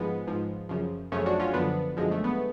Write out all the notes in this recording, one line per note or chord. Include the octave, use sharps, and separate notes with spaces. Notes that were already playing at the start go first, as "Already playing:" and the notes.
Already playing: G#2 F3 G#3 B3
G#2 F3
F#2 C#3 F3
F#2 C#3 F3 A3 C#4
D4 F#4
C#4 F4
F#2 D3 F3 B3 D4
F#2 D3 F3 G#3
A3
B3